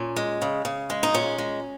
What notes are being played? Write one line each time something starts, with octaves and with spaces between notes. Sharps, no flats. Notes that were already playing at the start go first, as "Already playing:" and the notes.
Already playing: A#2 C#4
G#3
C#3
C#3
G#3
D#4
A#2 C#4
G#3